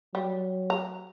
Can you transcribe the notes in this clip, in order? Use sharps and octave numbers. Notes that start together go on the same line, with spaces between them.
F#3 G3
A#5